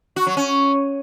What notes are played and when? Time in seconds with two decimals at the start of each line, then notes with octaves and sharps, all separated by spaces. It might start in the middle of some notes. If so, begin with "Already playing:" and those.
0.16 F#4
0.27 F#3
0.37 C#4